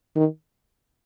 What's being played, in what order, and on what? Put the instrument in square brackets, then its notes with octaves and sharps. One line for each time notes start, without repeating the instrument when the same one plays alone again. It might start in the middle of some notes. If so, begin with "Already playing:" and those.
[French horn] D#3